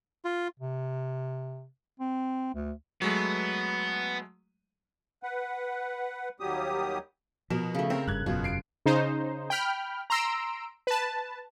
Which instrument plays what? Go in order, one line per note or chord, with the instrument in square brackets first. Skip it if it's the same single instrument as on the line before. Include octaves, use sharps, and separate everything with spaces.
[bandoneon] F4
[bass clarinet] C3
C4
D2
[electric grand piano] F#3 G#3 A3 [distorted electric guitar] B3
[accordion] B4 F#5
D#2 F#3 G3 G4 D#6
[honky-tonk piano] B2 E7 [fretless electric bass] F3 [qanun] A#4
[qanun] C#3 A3
[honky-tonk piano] C4 [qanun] A#4
[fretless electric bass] F#1 G2 [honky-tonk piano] F#6 G#6
[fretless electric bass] E1 F#2 [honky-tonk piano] B2 [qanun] F4
[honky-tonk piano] C7 D7
[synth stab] C#3 D#4 C5
G5 B5 F6
A#5 C6 E6 D7
B4 A5